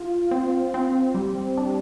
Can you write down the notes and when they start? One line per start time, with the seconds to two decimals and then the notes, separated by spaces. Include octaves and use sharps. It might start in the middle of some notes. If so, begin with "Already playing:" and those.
Already playing: F4
0.31 C4
0.74 C4
1.15 G3
1.57 D4